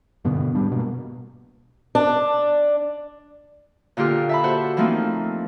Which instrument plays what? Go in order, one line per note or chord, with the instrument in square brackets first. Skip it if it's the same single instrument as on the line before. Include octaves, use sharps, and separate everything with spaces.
[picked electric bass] G2 B2 D3 B3
G#2 G3 D4
B2 A#3
[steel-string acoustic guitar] D4
[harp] A#2 D3 F4 G4 F6
E5 A5 B5
F#4 A4 C5 F#5
E3 F3 A3 A#3 C4 D#4